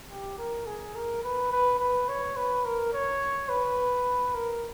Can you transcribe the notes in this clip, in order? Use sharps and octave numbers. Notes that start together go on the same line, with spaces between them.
G4
A#4
G#4
A#4
B4
B4
B4
C#5
B4
A#4
C#5
B4
A#4